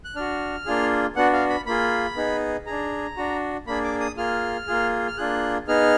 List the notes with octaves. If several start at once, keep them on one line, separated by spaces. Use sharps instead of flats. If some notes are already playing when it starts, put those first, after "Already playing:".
F#6
D4 F#4 F6
A#3 D4 F4 G#4
B3 D4 F#4 F#5
F5
B5
A#3 F4 G#4 B5
B3 D#4 G#4
D4 G#4 A#5
D4 F#4
A#3 D4 G#4 B5
D6
D#6
A#3 F4 G#4 F6
A#3 F4 G#4
F6
A#3 D4 F4 G#4 F#6
B3 D#4 G#4 F6